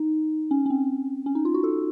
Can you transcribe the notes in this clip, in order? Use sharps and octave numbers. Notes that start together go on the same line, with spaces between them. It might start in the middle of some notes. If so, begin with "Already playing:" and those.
Already playing: D#4
C#4
C#4
C4
C#4
D#4
F4
F#4
A4